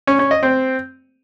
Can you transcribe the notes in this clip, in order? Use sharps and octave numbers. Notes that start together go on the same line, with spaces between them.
C#4
C#4
D#5
C4